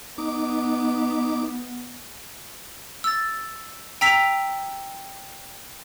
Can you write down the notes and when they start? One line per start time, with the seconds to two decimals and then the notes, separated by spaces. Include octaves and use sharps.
0.18 B3 D#4 D6
3.04 E6 A6
4.01 G5 A#5 E6 B6 D7 F7